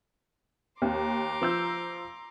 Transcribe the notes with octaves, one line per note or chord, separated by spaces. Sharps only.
D#2 A#5 C6 D6
F3 E6 G6